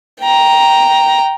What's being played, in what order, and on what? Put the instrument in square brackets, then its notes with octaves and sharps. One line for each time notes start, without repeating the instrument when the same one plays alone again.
[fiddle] G5 A#5